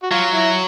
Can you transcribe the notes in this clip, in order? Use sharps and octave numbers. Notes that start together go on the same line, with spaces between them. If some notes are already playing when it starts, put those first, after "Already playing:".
F#4
F#3 F4
E4